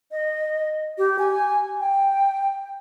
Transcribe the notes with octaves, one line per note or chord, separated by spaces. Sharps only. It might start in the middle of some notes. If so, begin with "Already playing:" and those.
D#5
G4
G#5
G5